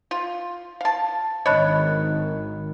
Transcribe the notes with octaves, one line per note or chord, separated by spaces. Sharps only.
F4
F5 A5
G#1 D#3 D4 C#5 D#5 B5 F#6